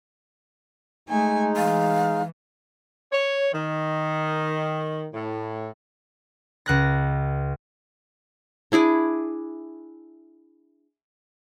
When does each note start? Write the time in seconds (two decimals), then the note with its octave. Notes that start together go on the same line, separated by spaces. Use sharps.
1.09 G#3 A3 D#4 G#5
1.57 E3 F5
3.12 C#5
3.54 D#3
5.13 A2
6.66 C#2 F#6 A#6
8.72 D4 E4 G#4 D6